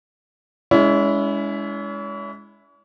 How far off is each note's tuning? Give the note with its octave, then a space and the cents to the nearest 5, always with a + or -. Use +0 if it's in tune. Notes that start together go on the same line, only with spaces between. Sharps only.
G#3 +0 C#4 +40 E4 +0